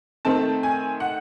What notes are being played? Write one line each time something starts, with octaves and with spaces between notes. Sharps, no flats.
D#3 A3 C4 A5
G#5
F#5